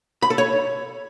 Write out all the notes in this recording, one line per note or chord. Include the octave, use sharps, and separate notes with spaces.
B5
A4
C#5